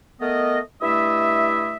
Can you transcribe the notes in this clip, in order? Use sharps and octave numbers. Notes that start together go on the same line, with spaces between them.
A3 B3 A#4 D#5
G2 A3 E4 D#5 E5